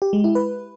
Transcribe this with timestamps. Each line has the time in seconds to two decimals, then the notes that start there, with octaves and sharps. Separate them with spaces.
0.02 G4
0.13 G#3
0.24 E4
0.35 B4